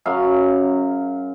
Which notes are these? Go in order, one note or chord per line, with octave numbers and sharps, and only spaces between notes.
F#2 C#3 F#3 F5